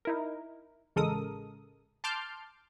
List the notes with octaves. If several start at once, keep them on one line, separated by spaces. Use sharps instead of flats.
D#4 E4 A#4
A1 C#3 G#3 A4 A#4 D#6
A5 C6 D6 F6 G6